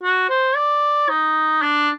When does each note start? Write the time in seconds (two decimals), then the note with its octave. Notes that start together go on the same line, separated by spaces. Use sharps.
0.03 F#4
0.29 C5
0.56 D5
1.09 D#4
1.62 D4